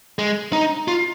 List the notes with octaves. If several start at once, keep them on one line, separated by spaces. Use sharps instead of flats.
G#3
D#4
F4